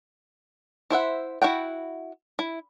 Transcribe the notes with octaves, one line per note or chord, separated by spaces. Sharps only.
E4 C5 E5 F#5
E4 F#4 F#5 G5
E4